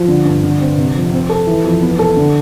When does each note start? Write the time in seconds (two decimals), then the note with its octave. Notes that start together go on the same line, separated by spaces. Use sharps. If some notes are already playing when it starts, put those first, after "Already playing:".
Already playing: F3
0.08 D3
0.25 G2
0.43 D3
0.60 C4
0.78 C3
0.95 F2
1.12 C4
1.29 A4
1.47 E3
1.64 F2
1.82 B3
1.99 A4
2.17 D3